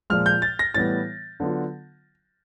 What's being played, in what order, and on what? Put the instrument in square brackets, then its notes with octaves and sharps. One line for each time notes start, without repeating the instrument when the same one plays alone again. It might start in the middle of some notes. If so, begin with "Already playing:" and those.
[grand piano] A#2 F3 G#3 F6
G6
A6
A#6
A2 E3 G3 B3 A6
D3 F#3 B3 D4 F4